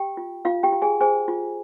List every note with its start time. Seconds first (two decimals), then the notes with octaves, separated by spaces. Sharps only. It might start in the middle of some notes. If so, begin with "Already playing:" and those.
Already playing: G4 G5
0.17 F4
0.45 F4 F5
0.63 G4 G5
0.72 F4
0.82 G#4 G#5
1.01 G#4 C5 G#5
1.28 F4